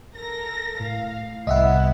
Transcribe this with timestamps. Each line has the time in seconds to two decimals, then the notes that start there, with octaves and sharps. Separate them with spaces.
0.16 A4 A#4 A#6
0.80 A2 F5
1.47 C2 B3 E4 D#5 E5 F#5